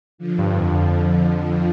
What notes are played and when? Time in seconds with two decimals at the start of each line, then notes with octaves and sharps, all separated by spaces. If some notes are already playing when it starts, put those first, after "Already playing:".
0.18 D3 F3
0.38 G2
0.58 F2
1.36 D3 F3